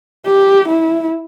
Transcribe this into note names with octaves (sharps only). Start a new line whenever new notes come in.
G4
E4